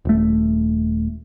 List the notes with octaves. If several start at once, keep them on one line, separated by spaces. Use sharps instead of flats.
D#1 A3